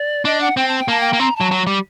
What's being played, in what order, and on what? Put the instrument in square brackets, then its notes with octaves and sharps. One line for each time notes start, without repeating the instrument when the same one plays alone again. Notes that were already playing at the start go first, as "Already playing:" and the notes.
Already playing: [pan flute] D5
[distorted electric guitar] D4 [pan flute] D#5
[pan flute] F#5
[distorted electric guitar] C4 [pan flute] G5
[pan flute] A5
G5
[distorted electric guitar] A#3 [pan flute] A5
[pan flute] G5
[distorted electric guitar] A#3
[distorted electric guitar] C4 [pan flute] A#5
[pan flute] A5
[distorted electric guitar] F#3
F#3
G3